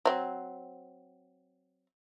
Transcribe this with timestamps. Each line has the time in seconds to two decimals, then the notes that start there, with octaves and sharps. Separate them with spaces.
0.05 F#3 C4